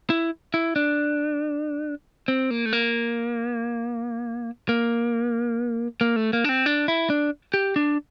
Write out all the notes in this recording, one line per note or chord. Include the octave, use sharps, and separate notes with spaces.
E4
E4
D4
C4
A#3
A3
A#3
A#3
A#3
A3
A#3
D4
C4
D4
E4
D4
G4
D4